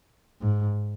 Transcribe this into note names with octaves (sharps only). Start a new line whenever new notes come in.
G#2